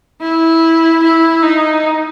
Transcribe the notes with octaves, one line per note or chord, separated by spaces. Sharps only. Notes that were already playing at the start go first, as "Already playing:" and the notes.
E4
E4
D#4